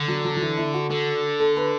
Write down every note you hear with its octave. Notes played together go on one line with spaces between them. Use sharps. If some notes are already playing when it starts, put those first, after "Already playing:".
Already playing: D3
F#3
F#3
F#3
E3
E4
F#4
D3
A4
B4